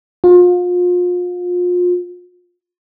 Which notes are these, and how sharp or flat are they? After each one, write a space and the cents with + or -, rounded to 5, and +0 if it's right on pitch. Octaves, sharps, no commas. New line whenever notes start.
F4 +35